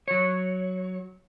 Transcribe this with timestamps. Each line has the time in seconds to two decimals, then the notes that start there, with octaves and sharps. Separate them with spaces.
0.08 F#3 C#5